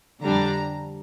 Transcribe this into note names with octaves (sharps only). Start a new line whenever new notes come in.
F2 D3 G3 D4 A#5